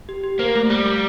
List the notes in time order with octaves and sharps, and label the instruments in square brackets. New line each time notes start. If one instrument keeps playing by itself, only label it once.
[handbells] G4
G4
[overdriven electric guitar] A#3 [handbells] C5
[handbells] A3
[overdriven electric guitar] G3 [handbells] A3
[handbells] A3